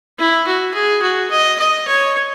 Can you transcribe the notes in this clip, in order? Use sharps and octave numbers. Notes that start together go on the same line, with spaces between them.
E4
F#4
G#4
F#4
D#5
D#5
C#5